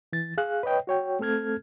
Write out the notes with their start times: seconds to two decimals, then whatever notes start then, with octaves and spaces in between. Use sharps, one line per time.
0.13 E3 A6
0.38 G#4 F5 F#6
0.63 B4 C#5 D#5 G5
0.87 F#4 C#5 G5
1.19 A3 C4 A4 F6 G#6